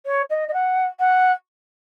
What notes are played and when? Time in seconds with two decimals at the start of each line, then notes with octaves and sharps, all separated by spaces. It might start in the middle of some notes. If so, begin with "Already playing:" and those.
0.06 C#5
0.30 D#5
0.48 D#5
0.53 F#5
0.99 F#5